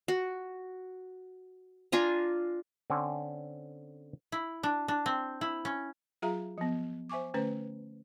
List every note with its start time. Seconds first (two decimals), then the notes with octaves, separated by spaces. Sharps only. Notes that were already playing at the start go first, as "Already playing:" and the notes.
0.08 F#4
1.92 D4 F4 G#5 A#5
2.90 D3 C4 C#4
4.32 E4
4.63 D4
4.88 D4
5.06 C4
5.41 E4
5.65 C#4
6.22 F#3 F4 G#4 E5 F5 A#5
6.58 F3 B3
7.09 C5 E5 G#5 C#6 D6
7.34 D3 A3 C#4 B4 C5